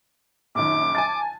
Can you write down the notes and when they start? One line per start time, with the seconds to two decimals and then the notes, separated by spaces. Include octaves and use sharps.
0.55 A#1 F#2 D#3 D6
0.95 G#5 A5 A6